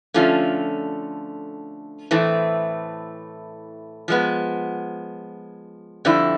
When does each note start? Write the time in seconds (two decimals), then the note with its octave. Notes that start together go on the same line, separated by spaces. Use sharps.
0.14 D3 F3 A3 C#4 F4
2.11 A2 E3 A3 C4
4.08 F3 G#3 B3
6.05 F2 D3 G3 C4 E4